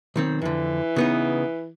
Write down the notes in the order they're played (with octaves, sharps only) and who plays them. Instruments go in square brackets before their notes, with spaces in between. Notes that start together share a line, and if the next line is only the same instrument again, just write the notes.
[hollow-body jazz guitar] B1 D#3 C4
[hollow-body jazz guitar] F2 D3 [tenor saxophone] E3
[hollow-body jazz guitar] C#3 B3 D#4